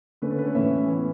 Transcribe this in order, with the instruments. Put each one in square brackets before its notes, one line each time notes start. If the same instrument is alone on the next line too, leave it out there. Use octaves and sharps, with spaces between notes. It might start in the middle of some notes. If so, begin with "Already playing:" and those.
[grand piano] D3 A3 C#4 B4
A4
B4
C#5
A2 E3 A3 C#4 E5
E3 B3